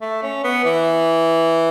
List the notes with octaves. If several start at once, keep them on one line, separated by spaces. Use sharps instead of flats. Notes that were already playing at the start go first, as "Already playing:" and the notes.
A3
C#4
B3
E3